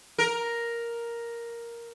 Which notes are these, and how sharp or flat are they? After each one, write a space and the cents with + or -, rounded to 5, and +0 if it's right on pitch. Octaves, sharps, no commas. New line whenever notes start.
A#4 +5